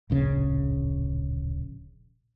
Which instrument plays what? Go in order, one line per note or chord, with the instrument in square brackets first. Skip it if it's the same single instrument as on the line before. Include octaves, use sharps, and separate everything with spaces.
[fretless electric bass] D1 A#1 C#3